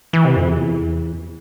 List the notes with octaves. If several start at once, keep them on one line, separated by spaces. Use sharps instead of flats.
E3
C3
F2
E2